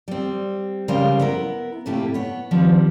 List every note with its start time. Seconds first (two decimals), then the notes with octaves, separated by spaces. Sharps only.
0.08 G3 C4
0.88 C#3 G3 G#3 A#4 C5 F5
1.20 B3 E4 A#4
1.86 A2 C3 A3 A#3 E4 G4
2.14 B3 C#5
2.51 D#3 F3 G3 C4